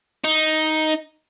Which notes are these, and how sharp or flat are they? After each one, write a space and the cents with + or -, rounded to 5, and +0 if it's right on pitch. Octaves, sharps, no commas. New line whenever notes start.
D#4 +5